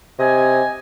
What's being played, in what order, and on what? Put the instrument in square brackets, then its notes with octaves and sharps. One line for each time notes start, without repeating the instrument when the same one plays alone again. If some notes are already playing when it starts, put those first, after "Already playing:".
[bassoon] C3 [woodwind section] D#5 G#5